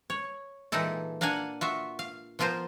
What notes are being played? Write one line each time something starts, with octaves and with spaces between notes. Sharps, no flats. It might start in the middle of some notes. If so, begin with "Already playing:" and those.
C#5
A#2 E3 G#3 D#4 E4 A4
A#3 D4 F5 F#5 G#5
F4 F#4 E5
F5
F3 B3 F4 A#4 C5